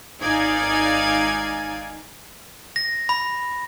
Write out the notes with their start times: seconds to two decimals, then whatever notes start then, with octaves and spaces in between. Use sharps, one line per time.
0.21 G#1 D#4 D5 F5 G#5 G#6
2.76 A#6
3.09 B5